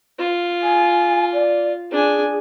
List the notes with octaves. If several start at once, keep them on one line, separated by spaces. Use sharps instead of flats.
F4
G#5
D5
D4 G#4 G#5